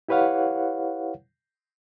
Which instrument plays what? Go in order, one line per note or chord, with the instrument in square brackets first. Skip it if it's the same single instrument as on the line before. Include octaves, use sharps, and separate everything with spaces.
[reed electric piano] E4 G4 B4 C#5 F5 F#5